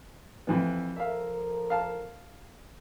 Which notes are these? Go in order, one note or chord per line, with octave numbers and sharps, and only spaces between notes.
F2 E3 B3
F3 A4 A#4 E5 F5
F5 A5